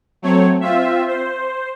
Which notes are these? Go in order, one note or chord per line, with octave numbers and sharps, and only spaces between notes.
F#3 A3 C4 C#5
C4 F4 E5
C5